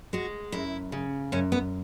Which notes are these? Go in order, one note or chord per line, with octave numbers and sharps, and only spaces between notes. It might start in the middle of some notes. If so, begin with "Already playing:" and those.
G#3 F#4
F#2 E4
C#3
F#2 C#4
B3